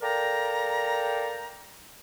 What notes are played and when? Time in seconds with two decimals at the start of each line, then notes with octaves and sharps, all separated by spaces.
0.02 A4 A#4 D5 F5 G5 A#5